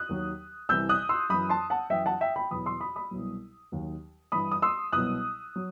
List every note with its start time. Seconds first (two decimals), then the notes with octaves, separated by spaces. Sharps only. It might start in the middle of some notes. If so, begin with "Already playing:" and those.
Already playing: D#6 F#6
0.09 D#2 D#3 F#3
0.69 C2 C3 E3 E6 G6
0.89 D#6 F#6
1.09 C6 E6
1.30 F#2 E3 B5 D#6
1.49 A5 C6
1.70 F#5 A5
1.90 F#2 E3 E5 G5
2.06 F#5 A5
2.21 E5 G5
2.36 G5 B5
2.51 E2 B2 F#3 B5 D#6
2.66 C6 E6
2.80 B5 D#6
2.96 B5 D#6
3.11 C2 B2 F#3
3.72 D#2 D#3 F#3
4.32 G2 E3 B5 D#6
4.52 D#6
4.62 C6 E6
4.92 C2 B2 F#3 D#6 F#6
5.56 F#3